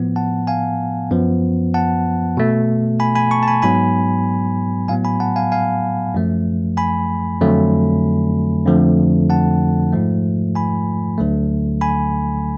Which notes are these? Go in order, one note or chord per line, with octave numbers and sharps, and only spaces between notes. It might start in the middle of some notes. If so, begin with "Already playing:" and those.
Already playing: A2 F3 B3
F#5 A5
F5 G#5
F#2 F3 B3
F#5 A5
B2 A3
G#5 B5
G#5 B5
A5 C#6
A5
G#5 B5
G#2 F#3 B3 G#5 B5
A2 F#3 B3 F5 G#5
G#5 B5
F#5 A5
F5 G#5
F5 G#5
F#2 F3 A3
G#5 B5
F2 D3 F#3 A3
F2 D3 F3 A3
F#5 A5
G#2 F3 A3
G#5 B5
D2 D3 F#3 A3
G#5 B5